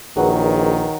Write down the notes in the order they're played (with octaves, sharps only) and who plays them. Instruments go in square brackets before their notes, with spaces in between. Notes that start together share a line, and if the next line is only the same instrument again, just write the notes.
[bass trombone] A#1 [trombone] D#3 [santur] F#3 [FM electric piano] G#4 B4